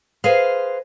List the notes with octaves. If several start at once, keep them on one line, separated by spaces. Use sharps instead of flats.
G#4 B4 C5 D#5 F5